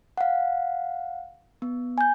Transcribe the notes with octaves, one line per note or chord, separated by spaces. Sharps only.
F5 F#5
B3
G#5 G6